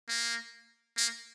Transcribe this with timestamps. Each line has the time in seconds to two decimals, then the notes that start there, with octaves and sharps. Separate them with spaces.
0.09 A#3
0.98 A#3